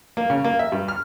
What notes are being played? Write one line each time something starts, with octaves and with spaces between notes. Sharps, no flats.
A#3
C#3
A#3
E5
G2
F6